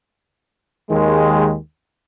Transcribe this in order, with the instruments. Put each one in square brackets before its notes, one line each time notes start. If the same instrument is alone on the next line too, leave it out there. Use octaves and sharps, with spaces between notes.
[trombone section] D#2 D#3 G#3